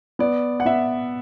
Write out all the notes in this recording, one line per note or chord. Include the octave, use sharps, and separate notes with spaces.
B3 D5
F#5
B3 E5